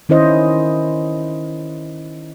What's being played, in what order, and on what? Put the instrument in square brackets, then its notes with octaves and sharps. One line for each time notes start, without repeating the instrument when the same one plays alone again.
[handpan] D#3 C#4 E4 C5 D#5